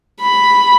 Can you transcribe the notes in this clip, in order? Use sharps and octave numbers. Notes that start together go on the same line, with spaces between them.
B5